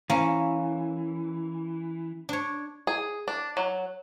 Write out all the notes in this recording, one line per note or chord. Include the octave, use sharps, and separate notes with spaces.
E3 A#3 C#4
D4 C#5
G#4
D4
F#3